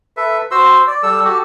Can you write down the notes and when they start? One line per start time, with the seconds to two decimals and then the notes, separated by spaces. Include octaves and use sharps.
0.17 A4 B4 E5
0.51 F#4 C5 C6 E6
0.87 D5
1.03 G3 A4 E6
1.25 F#4 G4 A4